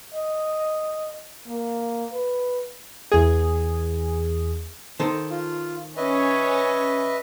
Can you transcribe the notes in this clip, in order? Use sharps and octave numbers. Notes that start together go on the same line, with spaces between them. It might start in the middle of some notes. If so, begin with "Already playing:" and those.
D#5
A#3
B4
E2 G#4
D#3 A4 C5
F4
C#4 B4 D#5 E5